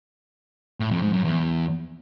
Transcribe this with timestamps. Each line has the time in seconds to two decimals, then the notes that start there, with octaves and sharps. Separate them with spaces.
0.80 A2
0.91 F2
1.02 G#2
1.13 F#2
1.24 E2